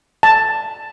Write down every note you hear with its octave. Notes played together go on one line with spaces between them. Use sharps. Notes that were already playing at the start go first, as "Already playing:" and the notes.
A5